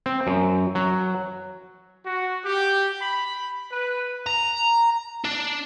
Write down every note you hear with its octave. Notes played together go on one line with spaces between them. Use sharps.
C4
F#2
F#3
F#4
G4
B5
B4
A#5
D4